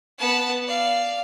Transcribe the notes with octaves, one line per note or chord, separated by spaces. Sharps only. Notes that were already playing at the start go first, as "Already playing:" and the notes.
B3 A5
D5 F5